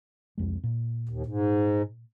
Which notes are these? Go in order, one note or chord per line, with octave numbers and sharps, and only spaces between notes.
C2 F2 G#3
A#2
D#2
G#2